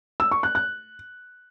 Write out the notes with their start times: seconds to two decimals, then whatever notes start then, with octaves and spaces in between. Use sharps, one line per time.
0.20 E6
0.31 C#6
0.43 F#6
0.55 F#6